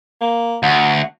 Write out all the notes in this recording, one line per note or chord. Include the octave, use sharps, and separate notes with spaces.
A#3
D2 F#5